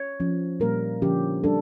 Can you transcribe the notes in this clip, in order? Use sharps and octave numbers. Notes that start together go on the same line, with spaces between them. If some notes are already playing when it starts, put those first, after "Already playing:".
Already playing: C#5
F3 C#4
A#2 G3 A#3 A#4
D3 F3 C#4 G4
G3 D4 A4